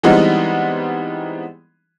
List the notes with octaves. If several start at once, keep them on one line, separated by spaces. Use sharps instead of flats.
E3 G3 G#3 B3 C4 D#4